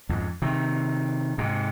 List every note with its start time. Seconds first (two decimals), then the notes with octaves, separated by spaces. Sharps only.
0.09 F2 G#2
0.42 C3 D#3
1.38 G#2 C3